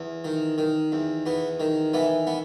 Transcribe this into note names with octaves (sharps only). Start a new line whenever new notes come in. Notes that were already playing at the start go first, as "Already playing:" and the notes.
Already playing: E2
D#3
D#3
E2
E2 B3
D#3
E3 B3
B3